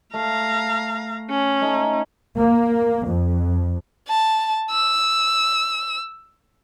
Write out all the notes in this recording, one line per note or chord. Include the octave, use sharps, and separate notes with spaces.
A3 F5 A#5
C#4
A3 D#4
A#3
F2
A5
E6